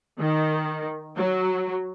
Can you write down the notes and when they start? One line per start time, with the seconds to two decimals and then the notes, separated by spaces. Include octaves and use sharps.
0.19 D#3
1.17 F#3